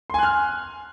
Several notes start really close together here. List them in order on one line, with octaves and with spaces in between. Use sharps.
C6 G#5 F#6 F6